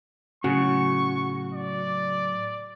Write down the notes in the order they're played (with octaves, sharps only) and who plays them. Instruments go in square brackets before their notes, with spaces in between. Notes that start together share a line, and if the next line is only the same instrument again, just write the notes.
[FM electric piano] A2 F#3 [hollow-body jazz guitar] C#3 [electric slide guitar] F#4 [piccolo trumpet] C#6
[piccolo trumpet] D5